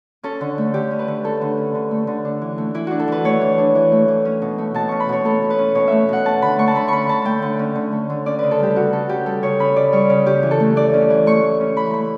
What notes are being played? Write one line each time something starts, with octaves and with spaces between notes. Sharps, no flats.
C#4 A4
D3
A3
D3 G4
C#4
B4
D3
A3 A4
D3
C#4
D3
A3
D3
D4
E3
A3
E3 E4
D4 F#4
A4
E3 B4
A3 C#5
E3
D4
E3
A3
E3
C#4
B2
A3
B2 A5
C#4 C#6
B5
B2 C#5
A3 A4
B2
B4
C#4
B2 C#5
A3 E5
B2 F#5
C#4 A5
D3 B5
A3 C#6
A5
D3 B5
C#4 B5 C#6
D3 A5
A3 G5
D3
C#4
D3
A3
D3
C#4 D5
C#3 B4
A4
G3 G4
C#3 F#4
C#4 A4
C#3 G4
G3 A4
C#3 C#5
C#4 B5
C#3 D5
G3 C#5
C#3
C#4 G4
E3
A4
A3
E3 D5
C#4
E3
A3 C#6
E3
C#4
E3 B5
A3 B5